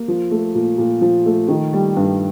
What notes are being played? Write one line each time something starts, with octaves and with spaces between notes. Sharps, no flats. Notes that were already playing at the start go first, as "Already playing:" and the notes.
Already playing: A#3
F3
A3
A#2
A#2
F3
A3
D#3
G3
G2